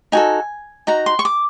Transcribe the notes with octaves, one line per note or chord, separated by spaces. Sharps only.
D#4 F#4 A4 G#5
D#4 F#4 A#5
C6
C#6
D6